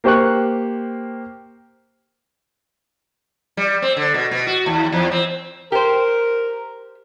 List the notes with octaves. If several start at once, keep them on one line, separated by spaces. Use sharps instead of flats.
A#3 G4 C5 C#6 F#6
G3
C4
D3
B2
B2
F#4
D#2
E2
C4
G4 A#4 C5